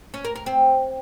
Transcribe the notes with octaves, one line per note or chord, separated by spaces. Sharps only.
C#4
A#4
A#4
C4